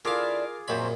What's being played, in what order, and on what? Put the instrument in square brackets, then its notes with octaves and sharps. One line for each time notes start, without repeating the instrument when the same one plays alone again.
[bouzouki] D3 D4 E4 [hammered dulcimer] F4 G#4 D6 [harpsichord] A#4 F5
[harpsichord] F#2 A#2 B5 [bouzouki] F3 C4 C#5